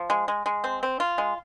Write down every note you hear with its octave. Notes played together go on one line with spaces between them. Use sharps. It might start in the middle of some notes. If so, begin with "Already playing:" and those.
Already playing: F3
G#3
G#3
G#3
C4
C4
F4
G#3